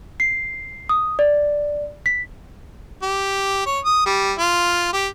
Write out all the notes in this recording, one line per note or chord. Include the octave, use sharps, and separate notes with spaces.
C7
D#6
D5
B6
G4
C#5
D#6
G3
F4
G4